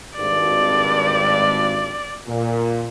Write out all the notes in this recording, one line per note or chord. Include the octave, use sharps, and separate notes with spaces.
G#1 G2 D5
A#2